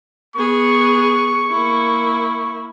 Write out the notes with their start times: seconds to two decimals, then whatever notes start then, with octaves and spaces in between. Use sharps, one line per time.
0.36 B3 G#4 C#6
1.51 A#3 E4